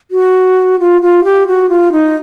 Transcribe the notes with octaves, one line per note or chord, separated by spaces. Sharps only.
F#4
F4
F4
G4
F#4
F4
D#4